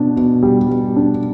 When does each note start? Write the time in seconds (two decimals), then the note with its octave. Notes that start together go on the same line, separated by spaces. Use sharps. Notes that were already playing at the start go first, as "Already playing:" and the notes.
Already playing: B2 D4
0.16 B2
0.43 G3
0.70 B2
0.96 D4